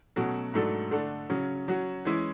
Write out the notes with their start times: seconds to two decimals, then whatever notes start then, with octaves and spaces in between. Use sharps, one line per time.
0.16 B2 F#3 A3 C#4 F#4
0.54 G#2 F#3 A3 D4 A4
0.91 D3 A3 D4 A4
1.30 C#3 F#3 C#4
1.68 F#3 C#4 F#4
2.05 E3 G#3 C#4 E4